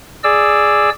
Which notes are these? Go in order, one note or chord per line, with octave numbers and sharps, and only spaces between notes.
G#4 D5 E6